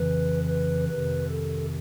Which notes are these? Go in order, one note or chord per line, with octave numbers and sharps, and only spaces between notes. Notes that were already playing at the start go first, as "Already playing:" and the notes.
Already playing: F2 C#3 E3 B4
B4
F2 C3 D#3 B4
A4